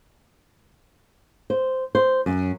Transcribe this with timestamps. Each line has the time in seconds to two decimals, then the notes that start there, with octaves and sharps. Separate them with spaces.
1.50 C5
1.95 C5
2.26 F#2